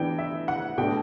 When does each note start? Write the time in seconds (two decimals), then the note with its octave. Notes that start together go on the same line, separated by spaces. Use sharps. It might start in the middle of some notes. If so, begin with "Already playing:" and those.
Already playing: E3 B3 D4 G5
0.18 E5
0.48 F#5
0.78 B2 A3 D4 G5